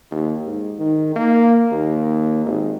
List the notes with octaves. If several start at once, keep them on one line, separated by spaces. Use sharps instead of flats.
D#2
G#2
D#3
A#3
D#2
G#1